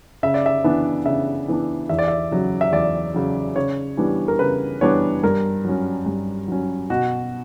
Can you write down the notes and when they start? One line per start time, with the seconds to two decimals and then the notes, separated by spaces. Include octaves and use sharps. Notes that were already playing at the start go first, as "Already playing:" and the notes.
0.23 C#3 E5
0.34 D5
0.46 E5
0.64 E3 B3 D4
1.06 C#3 E5
1.48 E3 B3 D4
1.89 E2 E5
1.99 D5
2.08 E5
2.31 C#3 F#3
2.61 E5
2.72 E2 D5
3.14 C#3 F#3
3.56 C#3 C#5
3.97 E3 G3 B3 D4
4.28 A#4
4.39 C#3 B4
4.81 E3 G3 B3 D4 C#5
5.23 G2 A#4
5.65 F#3 C#4
6.06 G2
6.48 F#3 C#4
6.90 B2 F#4